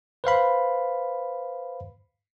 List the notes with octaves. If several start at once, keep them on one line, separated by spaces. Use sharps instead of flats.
B4 C5 F5 B5